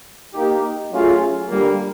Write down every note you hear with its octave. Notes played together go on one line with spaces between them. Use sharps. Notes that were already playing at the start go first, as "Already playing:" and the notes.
A#3 D#4 G4
F#3 A3 C#4 F4 G#4
D3 G3 A#3